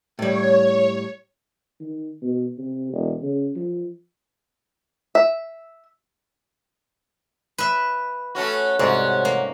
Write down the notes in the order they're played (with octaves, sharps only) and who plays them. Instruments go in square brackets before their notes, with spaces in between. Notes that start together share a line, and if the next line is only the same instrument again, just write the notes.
[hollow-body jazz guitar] A2 G3 [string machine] C#5
[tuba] D#3
B2
C3
E1
C#3
F3
[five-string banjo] E5
[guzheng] B4 E5
[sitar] A3 C#4 F#4
[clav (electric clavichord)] C2 G#2 D5 [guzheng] C3 [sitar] C#4 F#4
[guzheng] A#3